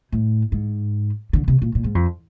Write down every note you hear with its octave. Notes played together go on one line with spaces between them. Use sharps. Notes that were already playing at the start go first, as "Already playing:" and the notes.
A2
G#2
D3
C3
A#2
A#2
G#2
F2